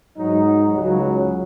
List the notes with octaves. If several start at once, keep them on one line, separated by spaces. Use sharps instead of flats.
G#2 F#3 D#4
C#2 C#3 F#3